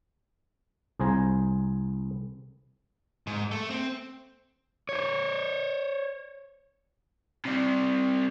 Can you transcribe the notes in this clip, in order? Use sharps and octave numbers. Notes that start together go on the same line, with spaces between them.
C2 G#4 C5 G#5 A#5
G#2
A3
C4
C5 C#5
C3 G3